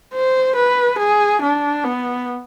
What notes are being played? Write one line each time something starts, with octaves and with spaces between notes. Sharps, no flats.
C5
B4
G#4
D4
B3